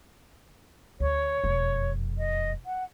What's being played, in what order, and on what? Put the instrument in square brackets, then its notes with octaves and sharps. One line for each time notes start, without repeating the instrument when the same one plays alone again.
[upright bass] D2 [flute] C#5
[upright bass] E1 F2
[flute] D#5
F#5